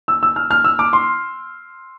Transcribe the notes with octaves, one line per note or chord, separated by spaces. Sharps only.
E6
E6
F6
F6
E6
D6
C6